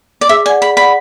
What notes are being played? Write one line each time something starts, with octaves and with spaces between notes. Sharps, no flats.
D5
G#4 E5
D5 F#5 G#5
G#4 B5
D5 F#5 B5